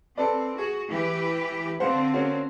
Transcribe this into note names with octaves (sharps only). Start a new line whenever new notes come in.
C4 A4 B4 D5
F#4 G#4
E3 G4 B4
D3 C4 C5 F5 F#5
A#3 C#4 F#4